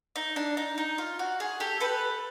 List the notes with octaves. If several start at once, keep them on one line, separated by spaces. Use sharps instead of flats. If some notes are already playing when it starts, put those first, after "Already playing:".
D#4
D4
D#4
D#4
F4
F#4
G#4
G4 A4
A4 B4